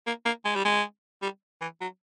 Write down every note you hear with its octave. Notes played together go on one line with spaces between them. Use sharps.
A#3
A#3
G#3
G3
G#3
G3
E3
F#3